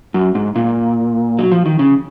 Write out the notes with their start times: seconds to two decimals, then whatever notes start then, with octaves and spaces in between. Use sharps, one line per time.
0.14 F#2
0.35 G#2
0.56 A#2
1.39 F#3
1.52 F3
1.66 D#3
1.79 C#3